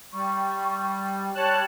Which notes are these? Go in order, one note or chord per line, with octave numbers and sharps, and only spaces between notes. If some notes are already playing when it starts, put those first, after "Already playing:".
G3 C#6
G3 C#5 A5 F#6